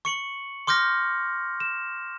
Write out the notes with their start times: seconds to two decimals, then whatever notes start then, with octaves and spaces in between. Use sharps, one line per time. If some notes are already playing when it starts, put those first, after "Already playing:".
0.05 C#6 C#7 F#7
0.67 C6 D6 F6 G6 A#6
1.60 E7